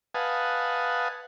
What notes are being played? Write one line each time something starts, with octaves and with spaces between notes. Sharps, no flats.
B4 D#5 F5 F#5 G#5 A5